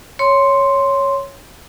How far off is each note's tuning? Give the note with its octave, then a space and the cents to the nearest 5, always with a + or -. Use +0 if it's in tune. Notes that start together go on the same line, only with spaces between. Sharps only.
C#5 +0 C6 +0